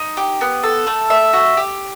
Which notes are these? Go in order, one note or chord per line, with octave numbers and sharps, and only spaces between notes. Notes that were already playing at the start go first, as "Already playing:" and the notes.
Already playing: D#4
G4
B3
A4
A3
E5
F#4
G4